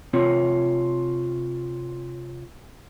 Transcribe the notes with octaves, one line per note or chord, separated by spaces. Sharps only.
C3 C4 F4 C#5